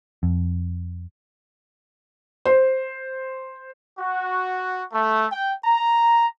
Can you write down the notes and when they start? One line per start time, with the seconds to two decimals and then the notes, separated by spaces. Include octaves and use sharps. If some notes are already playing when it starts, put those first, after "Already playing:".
0.23 F2
2.45 C5
3.99 F#4
4.92 A3
5.31 G5
5.64 A#5